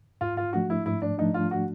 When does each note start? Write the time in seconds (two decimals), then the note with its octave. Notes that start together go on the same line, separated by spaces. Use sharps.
0.21 G#2 F4
0.37 F4
0.53 F3 A3 D4 F#4
0.70 E4
0.86 G#2 E4
1.02 D4
1.18 F3 A3 D4 D#4
1.34 F4
1.51 F#4